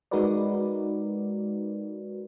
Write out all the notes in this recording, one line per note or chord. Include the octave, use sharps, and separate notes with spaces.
G#3 D#4 F#4 A#4 B4 D5